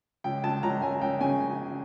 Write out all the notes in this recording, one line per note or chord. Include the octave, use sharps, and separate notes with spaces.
C#2 G5
C#2 A5
C#2 A#5
C#2 G#5
C#2 G5
C#3 G#5